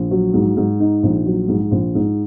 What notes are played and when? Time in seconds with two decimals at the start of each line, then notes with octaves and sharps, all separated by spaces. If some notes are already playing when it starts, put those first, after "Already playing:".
Already playing: A#1
0.11 F#3
0.34 G#2
0.57 G#2
0.80 D#4
1.03 A#1
1.26 F#3
1.48 G#2
1.71 A#1
1.95 G#2